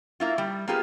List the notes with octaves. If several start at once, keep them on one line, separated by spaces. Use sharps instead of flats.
A#3 E4 F4
G3
A#3 B3 F4 G4 G#4